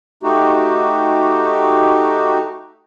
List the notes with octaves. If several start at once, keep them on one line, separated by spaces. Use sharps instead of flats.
A3 D#4 F#4 G4